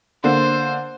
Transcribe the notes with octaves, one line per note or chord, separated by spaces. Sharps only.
D3 A#3 C5